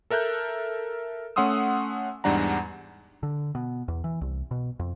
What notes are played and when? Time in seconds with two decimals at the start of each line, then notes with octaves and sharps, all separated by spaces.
0.10 A4 A#4 E5 F#6 G6
1.36 A3 C#4 F#5 C6 D#6 E6
2.24 E2 G#2 G3 D4 F#5 A#5
3.23 D3
3.55 B2
3.88 E2
4.04 E3
4.21 C2
4.51 B2
4.80 F2